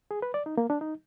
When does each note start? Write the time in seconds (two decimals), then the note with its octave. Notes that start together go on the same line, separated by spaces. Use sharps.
0.11 G#4
0.22 B4
0.34 D5
0.46 D#4
0.57 A#3
0.70 D4
0.81 D#4